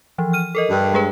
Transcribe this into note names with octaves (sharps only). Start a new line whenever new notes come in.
E3 F3
F6 D#7
A4 A#4 D#5
G2
G#3 G#4 B4